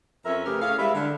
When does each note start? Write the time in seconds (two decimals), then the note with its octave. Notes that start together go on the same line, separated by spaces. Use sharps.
0.24 F2 C#4 A#4 C5 E5
0.45 C#3 A3 G4 G#4 A#4 B4
0.61 A2 C#4 G#4 F5
0.79 G3 G#3 B4 E5
0.94 D3